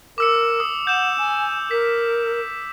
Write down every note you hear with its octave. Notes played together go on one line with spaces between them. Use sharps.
A#4 D6 E6 C#7
D#6
F#5 G6 E7
G#5
A#4 B6